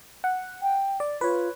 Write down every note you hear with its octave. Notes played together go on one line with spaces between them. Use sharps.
F#5
G5
D5
F4 B4 C#5